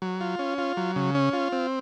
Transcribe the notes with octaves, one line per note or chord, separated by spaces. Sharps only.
F#3
F4
C#4
F4
F#3
C#3
C#4
F4
C4